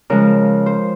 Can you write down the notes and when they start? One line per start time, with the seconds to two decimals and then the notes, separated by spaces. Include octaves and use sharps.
0.10 C#3 F3 G#3 A#4
0.66 C5